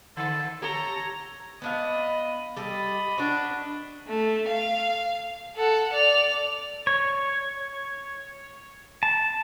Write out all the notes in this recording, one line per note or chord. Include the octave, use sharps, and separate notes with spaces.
D3 A4
G4 A4 C#5 A#5
B3 D4 D#5 F5 B5
G3 G4 A4 D#5 B5
D4 F#4 B4
A3
F5
A4 F#5
D5 F7
C#5
A5